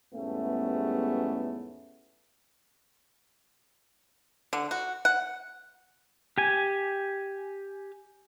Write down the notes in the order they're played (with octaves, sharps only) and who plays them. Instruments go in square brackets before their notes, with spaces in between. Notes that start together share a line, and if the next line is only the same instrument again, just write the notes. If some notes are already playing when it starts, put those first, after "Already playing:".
[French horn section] E2 G#2 G3 A3 B3 C#4
[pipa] D3
F#4
F#5
[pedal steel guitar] G4 G#5